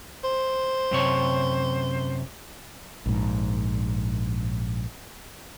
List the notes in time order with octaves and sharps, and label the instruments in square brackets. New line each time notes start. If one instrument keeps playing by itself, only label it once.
[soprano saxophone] C5
[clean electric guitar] F#2 C3 C#5
[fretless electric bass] A#1 G#2